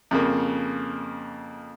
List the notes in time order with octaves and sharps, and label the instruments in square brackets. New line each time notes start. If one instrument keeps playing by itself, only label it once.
[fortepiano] F2 C#3 A#3